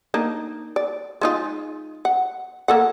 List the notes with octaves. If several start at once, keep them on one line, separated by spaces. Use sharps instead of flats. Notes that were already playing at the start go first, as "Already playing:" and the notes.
A#3 D4 D#4
D5
G#3 D#4 F4
F#5
A#3 A4 F#5